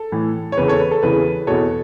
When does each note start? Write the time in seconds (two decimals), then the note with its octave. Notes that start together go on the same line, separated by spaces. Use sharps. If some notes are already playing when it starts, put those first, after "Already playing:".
Already playing: A4
0.12 A2 E3
0.52 C#5
0.57 E2 C#3 E3 B4
0.68 A4 C#5
0.80 B4
0.91 A4
1.03 E2 C#3 E3 B4
1.47 E2 B2 A4 C#5